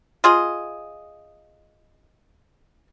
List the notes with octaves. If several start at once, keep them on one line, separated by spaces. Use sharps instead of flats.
F4 G#4 D#5